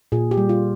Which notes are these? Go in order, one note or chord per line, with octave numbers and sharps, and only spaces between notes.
A#2 G#4
G4
G3
F4